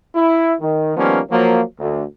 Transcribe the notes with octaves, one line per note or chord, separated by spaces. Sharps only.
E4
D#3
D#3 F3 G3 A#3 B3 C#4
F3 F#3 A#3
D2